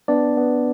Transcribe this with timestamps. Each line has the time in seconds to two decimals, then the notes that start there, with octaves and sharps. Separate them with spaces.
0.08 B3 D4 D5
0.37 B3